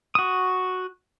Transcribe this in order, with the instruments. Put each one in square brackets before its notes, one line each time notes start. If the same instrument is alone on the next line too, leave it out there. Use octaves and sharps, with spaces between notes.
[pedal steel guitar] F#4 D#6